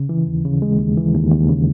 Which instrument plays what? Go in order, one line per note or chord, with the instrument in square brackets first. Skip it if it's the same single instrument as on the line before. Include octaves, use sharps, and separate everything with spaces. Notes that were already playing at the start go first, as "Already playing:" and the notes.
Already playing: [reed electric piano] C#3
E3
D#2
C#3
G#3
D#2
E3
D#2
D#2
C#3